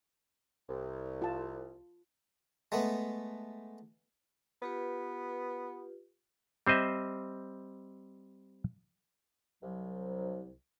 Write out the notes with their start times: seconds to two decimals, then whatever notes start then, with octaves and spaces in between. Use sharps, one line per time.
0.69 C2
1.22 F4 A5
2.72 G#3 A3 B3
4.62 B3 F4 G4 B4
6.67 G3 C4 C5 D#5 E5
9.62 C2 F#3